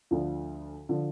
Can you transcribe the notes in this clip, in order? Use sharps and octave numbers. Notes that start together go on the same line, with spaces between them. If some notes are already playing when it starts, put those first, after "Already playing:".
D2 D3 F3
D3 F3